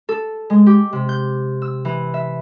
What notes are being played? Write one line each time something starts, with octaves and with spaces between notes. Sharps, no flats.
A4
G#3
G4
C3
G6
E6
E3
E5